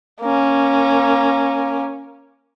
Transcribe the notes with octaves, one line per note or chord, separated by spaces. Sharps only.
A#3 C#4